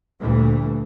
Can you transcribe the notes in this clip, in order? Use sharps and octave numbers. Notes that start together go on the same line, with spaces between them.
D2 A#2 E3 G3 A3